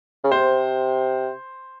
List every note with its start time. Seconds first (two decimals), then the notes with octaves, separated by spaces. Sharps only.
0.24 C#3
0.32 C3 C5